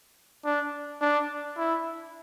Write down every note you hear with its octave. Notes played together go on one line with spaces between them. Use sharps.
D4
D4
E4